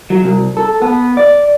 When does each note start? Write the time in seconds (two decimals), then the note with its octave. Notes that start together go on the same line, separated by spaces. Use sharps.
0.10 F#3
0.24 C2
0.57 A4
0.82 B3
1.17 D5